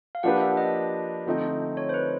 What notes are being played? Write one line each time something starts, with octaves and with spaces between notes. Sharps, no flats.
F5
F3 A#3 D4 G4 B4 F#5
E5
D#5
D3 F3 A3 C4 D#4
C#5
C5
B4